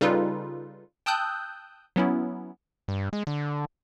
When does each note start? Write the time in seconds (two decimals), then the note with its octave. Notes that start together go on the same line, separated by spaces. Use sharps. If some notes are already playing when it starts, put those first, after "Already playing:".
0.01 C#3 G3 D#4 F4 A4 B4
1.06 G5 A5 D#6 E6 F#6 G6
1.96 F#3 B3 C#4 E4
2.88 G2
3.13 G#3
3.27 D3